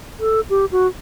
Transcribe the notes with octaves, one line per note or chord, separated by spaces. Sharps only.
A4
G4
F#4